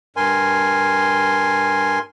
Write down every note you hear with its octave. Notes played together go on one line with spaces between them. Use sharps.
G2 A#4 G#5 C6